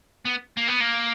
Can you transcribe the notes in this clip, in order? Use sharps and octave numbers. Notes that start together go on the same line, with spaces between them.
B3
A#3
B3
A#3